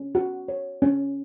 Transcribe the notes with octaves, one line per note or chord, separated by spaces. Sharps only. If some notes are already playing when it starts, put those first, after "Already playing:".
Already playing: C#4
F#4
C#5
C#4